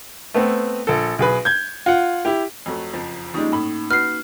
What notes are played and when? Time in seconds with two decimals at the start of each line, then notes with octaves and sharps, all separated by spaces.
0.34 A3 B3 C4
0.87 A#1 A4
1.19 B1 G#4 B4
1.45 G6 G#6
1.86 F4 F#5
2.25 E4 G4
2.66 F2 F#3 A3
2.94 F#1 F2 F3
3.34 F3 G3 G#3 A#3 C#4 D#4
3.52 A2 B5
3.91 F#4 B4 F6 C7